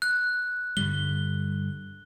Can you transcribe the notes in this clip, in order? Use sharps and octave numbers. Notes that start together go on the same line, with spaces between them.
F#6
G2 D3 G3 G7